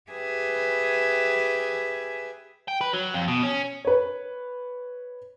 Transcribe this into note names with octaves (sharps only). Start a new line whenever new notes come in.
G4 G#4 B4 E5 G#5
G5
B4
F#3
F2
B2
C#4
B4 C#5